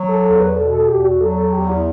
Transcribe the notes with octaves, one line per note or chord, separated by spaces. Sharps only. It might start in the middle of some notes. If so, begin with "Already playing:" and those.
Already playing: F#3
A4
E2 A4
B4
B2 A4
A4
E2 G4
F#4
F#3 A4
A4
E2 G4
E4